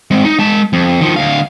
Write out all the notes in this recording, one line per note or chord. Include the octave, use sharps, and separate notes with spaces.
G#3 C4
D#4
G#3 A5
F2
D#3 F3
D2 F5